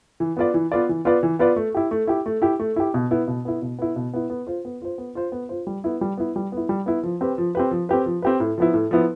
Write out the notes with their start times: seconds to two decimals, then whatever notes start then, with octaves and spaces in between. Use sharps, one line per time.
0.20 E3
0.37 B3 F4 B4 D5
0.54 E3
0.72 B3 F4 B4 D5
0.89 E3
1.05 B3 F4 B4 D5
1.23 E3
1.39 B3 F4 B4 D5
1.56 A3
1.75 E4 G4
1.91 A3
2.07 E4 G4
2.26 A3
2.42 E4 G4
2.59 A3
2.76 E4 G4
2.94 B2
3.11 B3 E4
3.28 B2
3.45 B3 E4
3.62 B2
3.79 B3 E4
3.96 B2
4.14 B3 E4
4.30 B3
4.47 F4 C5
4.65 B3
4.82 F4 C5
4.98 B3
5.15 F4 C5
5.32 B3
5.49 F4 C5
5.67 G3
5.84 B3 E4
6.01 G3
6.17 B3 E4
6.36 G3
6.52 B3 E4
6.69 G3
6.86 B3 E4
7.03 F3
7.21 C4 G4 B4
7.38 F3
7.55 C4 G4 B4
7.71 F3
7.89 C4 G4 B4
8.06 F3
8.22 C4 G4 B4
8.40 A2
8.58 F3 B3 E4
8.74 A2
8.91 F3 B3 E4